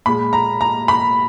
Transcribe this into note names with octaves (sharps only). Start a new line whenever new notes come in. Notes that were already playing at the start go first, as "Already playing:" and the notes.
A#2 G#3 B5
A#5
A#5
B5